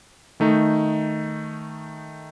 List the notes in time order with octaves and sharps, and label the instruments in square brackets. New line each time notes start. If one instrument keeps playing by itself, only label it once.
[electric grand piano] D#3 A3 D#4